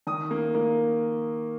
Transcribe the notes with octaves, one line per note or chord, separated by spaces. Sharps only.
D#3 D#6
A#3
A#3